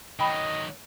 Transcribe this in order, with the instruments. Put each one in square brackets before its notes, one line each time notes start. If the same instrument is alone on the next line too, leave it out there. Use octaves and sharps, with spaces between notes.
[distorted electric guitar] D#3 F#3 [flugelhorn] D#5 [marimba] G5 B5